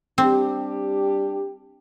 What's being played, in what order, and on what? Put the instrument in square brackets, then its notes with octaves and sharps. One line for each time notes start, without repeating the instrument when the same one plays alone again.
[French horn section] G3 D4 G4 [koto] C4